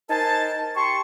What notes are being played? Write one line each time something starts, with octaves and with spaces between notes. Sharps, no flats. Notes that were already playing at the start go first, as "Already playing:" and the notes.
D#4 A#4 C5 G#5 A5
G4 A5 C6 C#6